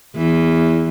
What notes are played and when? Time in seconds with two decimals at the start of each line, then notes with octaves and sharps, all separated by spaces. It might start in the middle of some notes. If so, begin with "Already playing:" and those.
0.16 E2 E3